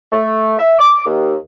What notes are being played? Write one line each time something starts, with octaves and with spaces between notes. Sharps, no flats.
A3
E5
D6
D#2